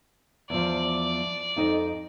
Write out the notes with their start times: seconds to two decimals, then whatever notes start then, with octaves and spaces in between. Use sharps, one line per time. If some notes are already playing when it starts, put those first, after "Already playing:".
0.50 E2 F3 D5
1.56 F2 D#4 D#5